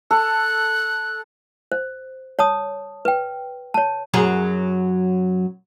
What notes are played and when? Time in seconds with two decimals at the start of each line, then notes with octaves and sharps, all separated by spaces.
0.11 A4 F#6
1.72 C5
2.39 C#5 A5 D#6
3.05 B4 G5
3.74 C#5 A5
4.14 F#2 F#3 G#4